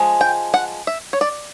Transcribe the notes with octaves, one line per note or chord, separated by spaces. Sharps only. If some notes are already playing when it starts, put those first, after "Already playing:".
Already playing: F3 G#3
G5
F#5
E5
C#5
D5